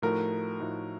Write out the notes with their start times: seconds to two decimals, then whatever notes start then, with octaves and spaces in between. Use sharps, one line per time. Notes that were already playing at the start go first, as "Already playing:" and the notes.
0.02 A2 F3 A3 D#4 F#4 A#4
0.60 A2 F3 A3 D#4 F#4